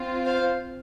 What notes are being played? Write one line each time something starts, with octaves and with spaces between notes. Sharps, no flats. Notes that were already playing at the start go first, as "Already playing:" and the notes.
Already playing: C4 F4
C5 F5